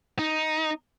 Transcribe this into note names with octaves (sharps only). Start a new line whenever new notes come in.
D#4